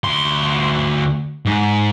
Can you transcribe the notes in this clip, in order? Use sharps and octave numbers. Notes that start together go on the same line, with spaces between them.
D2 C6
G#2